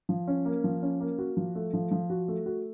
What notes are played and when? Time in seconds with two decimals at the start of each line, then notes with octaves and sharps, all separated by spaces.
0.09 F3
0.27 C#4
0.45 A#3
0.64 F3
0.82 C#4
1.00 A#3
1.19 F#4
1.37 F3
1.55 A3
1.73 F3
1.91 F3
2.10 F#4
2.28 A3
2.46 F#4